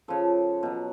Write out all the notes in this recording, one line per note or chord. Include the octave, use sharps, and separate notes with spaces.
C#3 F3 A4
B2 F#3